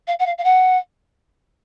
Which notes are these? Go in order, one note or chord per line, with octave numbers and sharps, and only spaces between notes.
F5
F#5
F5
F5
F#5